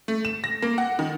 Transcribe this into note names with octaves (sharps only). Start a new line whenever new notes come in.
A3
E7
A#6
A#3
F#5
D#3